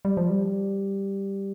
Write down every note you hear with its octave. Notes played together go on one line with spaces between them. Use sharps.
G3
F3
G3